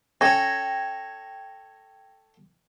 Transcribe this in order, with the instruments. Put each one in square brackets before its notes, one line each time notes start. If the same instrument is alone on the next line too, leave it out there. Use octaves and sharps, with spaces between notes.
[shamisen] C#4 [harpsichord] A4 C#5 [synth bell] G5 G#6 A#6